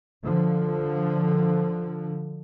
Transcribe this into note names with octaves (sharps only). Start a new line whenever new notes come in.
D3 F3